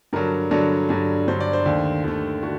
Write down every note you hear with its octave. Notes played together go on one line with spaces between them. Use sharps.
G2 D3 F#3 A#4
G2 D3 F#3
G2 D3 F#3
G2 D3 F#3 C5
D5
C5
D#2 D3 A3
D#2 D3 A3
D3 F#4